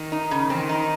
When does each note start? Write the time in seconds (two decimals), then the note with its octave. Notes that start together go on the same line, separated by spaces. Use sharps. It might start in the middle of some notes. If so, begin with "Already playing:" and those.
Already playing: D#3
0.12 D#4
0.31 C#3
0.50 D#3 C4
0.69 D#4